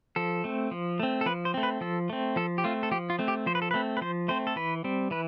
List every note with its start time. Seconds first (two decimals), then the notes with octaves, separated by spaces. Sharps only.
0.16 F3 A4
0.44 A3 C4
0.71 F3
1.00 A3 C4
1.21 A4
1.26 F3 B4
1.45 C5
1.54 A3 C4
1.63 B4
1.81 F3 A4
2.10 A3 C4
2.36 F3 A4
2.58 G4
2.64 A3 C4 F4
2.83 A4
2.92 F3 G4
3.10 F4
3.19 A3 C4
3.28 G4
3.46 F3 C5
3.55 B4
3.62 A4
3.71 A3 C4 B4
3.97 B4
4.01 F3 C5
4.28 A3 C4 C5
4.47 A4
4.56 E3 B4
4.84 G3 C4
5.11 E3 B4